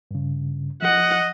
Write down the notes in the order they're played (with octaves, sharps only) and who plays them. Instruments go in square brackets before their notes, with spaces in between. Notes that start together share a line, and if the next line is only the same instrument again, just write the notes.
[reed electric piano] G2 C#3
[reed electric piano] F3 [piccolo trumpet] D#5 [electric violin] F#5